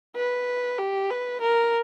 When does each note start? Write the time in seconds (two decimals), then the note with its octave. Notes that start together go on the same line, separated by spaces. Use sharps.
0.16 B4
0.78 G4
1.10 B4
1.41 A#4